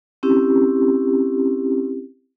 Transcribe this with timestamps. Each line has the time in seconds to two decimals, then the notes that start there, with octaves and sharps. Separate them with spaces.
0.23 C4 C#4 E4 G4